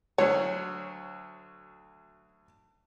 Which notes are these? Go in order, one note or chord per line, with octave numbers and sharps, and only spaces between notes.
D2 F#3 C#5